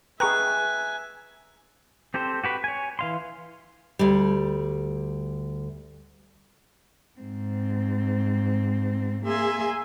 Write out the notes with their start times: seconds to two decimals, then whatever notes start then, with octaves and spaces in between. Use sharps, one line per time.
0.20 G#4 B4 E5 G5 G#5 A#5 C#6 F#6
2.14 C4 G4 A4 C5
2.44 F#4 G4 B4
2.64 C#5 G#5
2.99 E3 F5 C6
3.99 D2 G3
7.20 G#2 C4
9.26 A#3 G#4 E5 G#5 C6